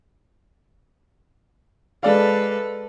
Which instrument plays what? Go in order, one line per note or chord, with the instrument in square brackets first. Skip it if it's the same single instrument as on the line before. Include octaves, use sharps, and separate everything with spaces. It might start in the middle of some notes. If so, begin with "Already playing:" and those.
[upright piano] G#3 D5 F5 [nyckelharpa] A4 B4